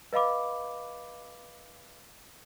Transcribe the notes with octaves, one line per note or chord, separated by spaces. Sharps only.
B4 D#5 F5 B5 D6